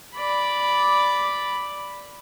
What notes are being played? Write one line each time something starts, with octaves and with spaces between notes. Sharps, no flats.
D5 B5